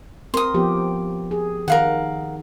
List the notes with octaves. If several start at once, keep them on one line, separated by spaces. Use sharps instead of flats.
C4 A#4 C6 D#6
F3 B3 G4
G#4
D#3 A#4 F5 F#5